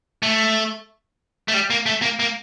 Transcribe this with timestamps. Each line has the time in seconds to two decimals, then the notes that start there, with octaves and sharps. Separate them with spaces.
0.23 A3
1.48 A3
1.54 G3
1.70 A#3
1.86 A3
2.02 A#3
2.19 A#3